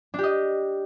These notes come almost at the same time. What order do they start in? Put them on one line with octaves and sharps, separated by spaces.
D4 G4 D#5